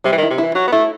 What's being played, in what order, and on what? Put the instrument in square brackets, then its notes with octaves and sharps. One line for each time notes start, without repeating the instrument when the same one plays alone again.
[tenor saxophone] C3 [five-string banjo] G3
[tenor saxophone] E3
D#3
[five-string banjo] E4
[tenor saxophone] C3
[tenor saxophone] E3 [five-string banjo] E4
[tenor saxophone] F#3 [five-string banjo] F#4
[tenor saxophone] B3
[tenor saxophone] A3 [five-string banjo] E4